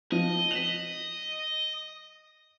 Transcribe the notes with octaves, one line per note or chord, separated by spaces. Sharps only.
F3 D#5
B6 E7 F#7